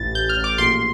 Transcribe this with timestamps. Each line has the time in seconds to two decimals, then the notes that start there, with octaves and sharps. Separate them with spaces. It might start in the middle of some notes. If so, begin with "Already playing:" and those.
Already playing: A1 E3 A6
0.15 A1 G6
0.29 F6
0.36 A1
0.44 D6
0.58 A#1 C6